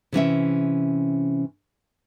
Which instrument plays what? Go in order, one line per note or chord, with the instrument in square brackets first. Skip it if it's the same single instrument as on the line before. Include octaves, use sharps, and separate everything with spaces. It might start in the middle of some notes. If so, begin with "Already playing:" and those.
[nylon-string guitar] C3 E3 C#4 E5